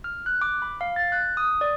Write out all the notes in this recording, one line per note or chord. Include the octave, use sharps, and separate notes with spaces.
F6
F#6
D6
B5
F5
A6
F#6
D#6
D5